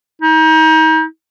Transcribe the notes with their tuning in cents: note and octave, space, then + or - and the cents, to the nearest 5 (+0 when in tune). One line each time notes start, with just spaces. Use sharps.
D#4 +35